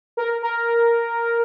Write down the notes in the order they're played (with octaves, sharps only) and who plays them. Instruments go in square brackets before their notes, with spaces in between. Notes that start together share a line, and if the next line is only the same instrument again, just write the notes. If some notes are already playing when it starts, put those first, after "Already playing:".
[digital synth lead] A#4
A#4